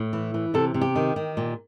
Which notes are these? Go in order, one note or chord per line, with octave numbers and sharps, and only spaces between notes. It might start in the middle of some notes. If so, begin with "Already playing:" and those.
Already playing: A2
E3
E3
C3 A4
C3
G4
D#3
D#3
A#2